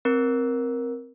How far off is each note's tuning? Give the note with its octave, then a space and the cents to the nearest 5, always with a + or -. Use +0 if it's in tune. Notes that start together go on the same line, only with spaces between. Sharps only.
C4 +0 A#4 +10